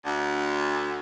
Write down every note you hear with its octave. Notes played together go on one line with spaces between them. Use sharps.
D2